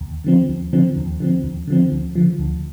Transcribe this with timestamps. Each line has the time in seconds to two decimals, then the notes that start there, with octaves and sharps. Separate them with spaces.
0.01 D#2
0.24 D3 F3 C4
0.49 D#2
0.73 D3 F3 C4
0.97 D#2
1.20 D3 F3 C4
1.44 D#2
1.67 D3 F3 C4
1.92 D2
2.16 D3 F3
2.39 D2